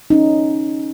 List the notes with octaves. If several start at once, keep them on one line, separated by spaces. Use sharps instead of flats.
C#4 D#4